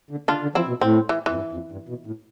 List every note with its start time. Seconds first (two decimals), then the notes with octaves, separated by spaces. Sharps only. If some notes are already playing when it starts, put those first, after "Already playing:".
0.11 D3
0.28 D3 D4 F4
0.42 D3
0.55 F3 C4 E4
0.68 B2
0.81 A2 C4
1.09 E3
1.26 F2 E3
1.35 G2
1.53 F2
1.72 G2
1.89 B2
2.06 A2